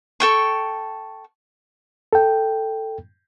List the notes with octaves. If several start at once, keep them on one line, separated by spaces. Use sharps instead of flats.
A4 G5 C#6
A4 G5